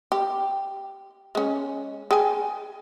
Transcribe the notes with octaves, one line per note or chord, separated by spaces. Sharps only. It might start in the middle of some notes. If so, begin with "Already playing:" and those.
G4
G#3 C#4
G#4 G5 G#5